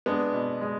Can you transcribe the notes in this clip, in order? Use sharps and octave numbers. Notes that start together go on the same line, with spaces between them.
G#3 B3 D4
B2
G#3